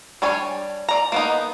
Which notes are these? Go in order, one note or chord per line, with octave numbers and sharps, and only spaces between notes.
G3 D4 C#5 G#5
D5 A#5
A#3 B3 D#4